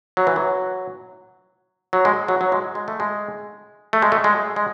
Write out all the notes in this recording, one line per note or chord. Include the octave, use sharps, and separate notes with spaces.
F#3
E3
F#3
F#3
G#3
F#3
F#3
G#3
G#3
A3
G#3
A3
G#3
A3
G#3
G#3